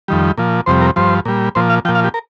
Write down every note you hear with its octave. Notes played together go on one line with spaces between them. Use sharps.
F2 D#3 G3
A#2 F3
F2 C3 G3 C5
A#4
G2 F3 C5
A#2 G3
A#2 F3 C5
F5
A#2 F3 G5
F5
G4
A#4